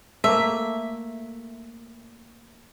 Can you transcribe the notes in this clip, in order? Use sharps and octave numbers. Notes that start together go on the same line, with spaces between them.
A3 A#3 E5